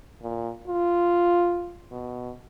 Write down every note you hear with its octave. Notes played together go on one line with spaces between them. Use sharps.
A#2
F4
B2